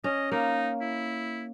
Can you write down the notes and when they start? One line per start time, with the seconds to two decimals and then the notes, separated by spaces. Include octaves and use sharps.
0.04 C#4 D#5
0.32 A#3 D#4
0.81 E4